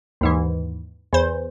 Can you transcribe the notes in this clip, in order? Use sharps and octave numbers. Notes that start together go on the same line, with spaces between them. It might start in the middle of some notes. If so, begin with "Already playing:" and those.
D#2 G#2 E3
E2 C5